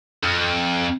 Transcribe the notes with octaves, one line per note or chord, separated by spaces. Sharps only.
F2